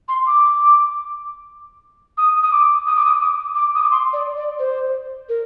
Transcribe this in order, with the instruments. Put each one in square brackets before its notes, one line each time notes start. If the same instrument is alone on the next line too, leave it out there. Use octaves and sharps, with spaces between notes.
[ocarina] C6
D6
D#6
D#6
D6
D#6
D6
D#6
D6
D6
D#6
D6
C6
D5
D5
C5
A#4